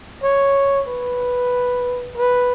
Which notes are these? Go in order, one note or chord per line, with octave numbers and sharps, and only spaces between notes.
C#5
B4
B4